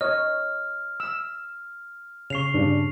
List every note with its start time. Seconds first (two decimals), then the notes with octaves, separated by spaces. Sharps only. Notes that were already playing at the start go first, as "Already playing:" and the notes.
0.01 C#5 D#5 F6
1.00 E6
2.30 C#3 C#6 C7 F7
2.54 G2 C#3 D4